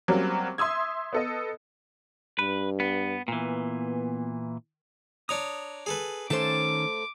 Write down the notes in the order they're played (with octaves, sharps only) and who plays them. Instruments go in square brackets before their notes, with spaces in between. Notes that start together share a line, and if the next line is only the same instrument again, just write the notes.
[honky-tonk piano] F#3 G3 A#3 C4 C#4
E5 C6 D#6 E6 G#6
B3 A4 D#5
[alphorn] G2 [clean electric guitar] B4
[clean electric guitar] B3
[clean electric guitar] A#2 E3 [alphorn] B3
[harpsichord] D4 C#5 A#5 [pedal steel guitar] D#6
[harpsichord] G#4 A4 B4
[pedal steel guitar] D#3 C#4 [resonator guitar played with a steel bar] A3 A4 C5 [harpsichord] A5 [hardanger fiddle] D6